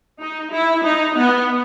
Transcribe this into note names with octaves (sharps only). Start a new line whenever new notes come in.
D#4
E4
D#4
B3